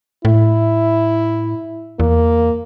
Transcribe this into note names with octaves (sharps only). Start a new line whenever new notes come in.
A2 E4
E2 A#3